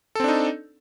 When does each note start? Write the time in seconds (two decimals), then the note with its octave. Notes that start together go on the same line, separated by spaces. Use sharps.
0.15 A4
0.20 C4
0.24 D4
0.28 D#4